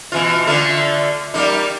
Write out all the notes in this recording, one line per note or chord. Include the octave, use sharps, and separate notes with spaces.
B2 E3 F4
D3 A3 F4
G3 A#3 D#4